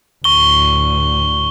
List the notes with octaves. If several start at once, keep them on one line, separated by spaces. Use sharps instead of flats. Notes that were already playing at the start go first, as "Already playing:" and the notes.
D2 A2 C#6 G7